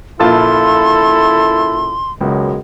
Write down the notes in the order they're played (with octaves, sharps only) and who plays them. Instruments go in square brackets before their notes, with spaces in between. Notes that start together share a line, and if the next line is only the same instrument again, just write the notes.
[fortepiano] A#1 F4 A5 [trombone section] A#2 C#3 E4 [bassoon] A4 [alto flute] C6
[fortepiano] C#2 [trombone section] F#2 B2 G#3